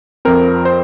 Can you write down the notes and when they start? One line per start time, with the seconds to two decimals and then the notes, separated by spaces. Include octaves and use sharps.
0.25 F2 F3 C4 A#4
0.65 C5